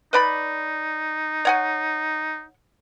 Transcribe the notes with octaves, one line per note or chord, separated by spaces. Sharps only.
D#4 B4 D5 B5
C#5 F#5 G#5